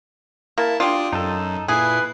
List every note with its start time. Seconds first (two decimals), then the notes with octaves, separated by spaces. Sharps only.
0.58 A#3 E4 A5
0.80 D4 F4 G4 D6 D#6
1.13 F#2 D#4 A4
1.68 A#2 E4 G#4 B4 C7